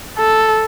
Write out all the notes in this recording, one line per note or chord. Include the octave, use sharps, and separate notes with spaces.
A4